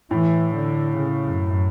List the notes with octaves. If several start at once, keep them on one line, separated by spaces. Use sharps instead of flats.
A2 E3
D3
C#3
F#2